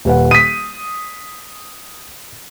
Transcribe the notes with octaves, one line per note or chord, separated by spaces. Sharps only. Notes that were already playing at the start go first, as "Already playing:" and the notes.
D#1 B4 F#5
D#6 B6 D#7